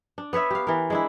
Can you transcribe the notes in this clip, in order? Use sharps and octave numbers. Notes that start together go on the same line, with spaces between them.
D4
B3 B4 C#5 E5
G4 F5
E3 A#4
G#3 D4 E4